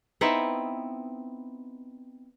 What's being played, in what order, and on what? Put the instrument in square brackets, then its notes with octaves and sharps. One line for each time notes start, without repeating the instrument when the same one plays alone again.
[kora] B3 C4 D#4 E4